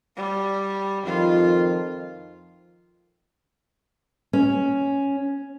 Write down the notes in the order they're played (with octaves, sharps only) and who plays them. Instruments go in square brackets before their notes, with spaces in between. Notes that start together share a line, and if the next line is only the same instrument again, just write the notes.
[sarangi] G3
[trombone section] F2 D#3 F3 [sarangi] F4
[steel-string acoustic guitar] C#4